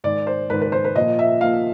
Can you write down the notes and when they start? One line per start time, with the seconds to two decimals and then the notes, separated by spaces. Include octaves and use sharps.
0.04 G#2 D#3 D5
0.27 C5
0.50 G#2 D#3 B4
0.61 B4
0.72 C5
0.84 B4
0.96 A#2 F3 D#5
1.19 E5
1.41 A#2 F3 F5